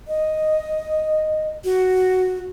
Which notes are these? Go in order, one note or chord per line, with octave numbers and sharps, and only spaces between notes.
D#5
F#4